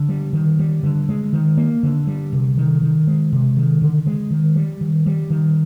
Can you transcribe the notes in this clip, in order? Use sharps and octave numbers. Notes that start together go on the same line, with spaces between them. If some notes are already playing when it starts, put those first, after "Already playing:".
Already playing: D3
G3
D#3
G3
D3
G#3
D#3
A#3
D3
G3
C3
D#3
D#3
G#3
C3
D#3
D3
G#3
D#3
G3
D#3
G3
D#3